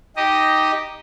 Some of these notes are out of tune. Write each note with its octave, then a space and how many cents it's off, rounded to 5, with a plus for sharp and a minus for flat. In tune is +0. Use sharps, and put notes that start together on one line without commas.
D#4 +5 G4 -5 D#5 +0